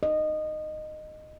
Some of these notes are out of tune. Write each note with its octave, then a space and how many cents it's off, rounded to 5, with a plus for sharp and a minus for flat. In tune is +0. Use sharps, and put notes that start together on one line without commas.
D#5 -15